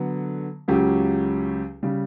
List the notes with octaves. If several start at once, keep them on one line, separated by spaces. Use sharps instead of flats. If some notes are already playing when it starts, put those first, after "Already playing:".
Already playing: D3 F#3 B3
C#2 C#3 F#3 C#4 G4
C#3 G3